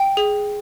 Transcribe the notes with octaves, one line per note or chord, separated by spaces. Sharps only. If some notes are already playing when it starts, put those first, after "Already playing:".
Already playing: G5
G#4